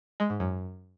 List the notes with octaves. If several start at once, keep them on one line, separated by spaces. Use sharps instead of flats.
G#3
G#2
F#2